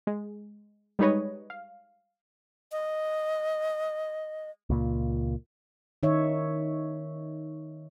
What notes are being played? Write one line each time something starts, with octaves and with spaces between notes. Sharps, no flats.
G#3
G3 G#3 D#4 B4 C#5 D#5
F5
D#5
C#2 A#2
D#3 D#4 C#5 E5